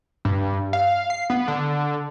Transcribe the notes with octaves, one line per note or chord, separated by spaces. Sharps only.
G2
F5
C7
B3
D3